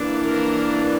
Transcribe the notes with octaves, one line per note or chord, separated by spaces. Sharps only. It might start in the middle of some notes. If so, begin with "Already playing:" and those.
Already playing: E3 A#3 D4
A#4